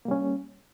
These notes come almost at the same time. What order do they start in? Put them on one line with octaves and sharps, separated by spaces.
A#3 G3 C#4